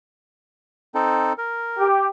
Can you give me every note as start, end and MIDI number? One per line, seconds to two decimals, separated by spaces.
0.95 1.33 60
0.95 1.33 63
0.95 1.33 69
1.38 1.87 70
1.78 2.06 67